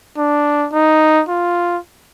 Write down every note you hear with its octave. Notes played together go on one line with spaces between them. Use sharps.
D4
D#4
F4